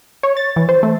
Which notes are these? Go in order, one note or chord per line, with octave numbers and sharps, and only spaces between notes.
C#5
A6
E3
C5
A3